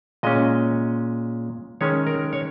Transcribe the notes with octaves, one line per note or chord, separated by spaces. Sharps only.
A#2 G#3 C#4 D#5
D#3 G#3 C#4 C#5
A#4
C#5